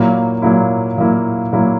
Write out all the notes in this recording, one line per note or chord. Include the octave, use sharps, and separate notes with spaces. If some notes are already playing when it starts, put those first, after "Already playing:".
Already playing: A#2 F#3 A#3 E4
A#2 F#3 A#3 E4
A#2 F#3 A#3 E4
A#2 F#3 A#3 E4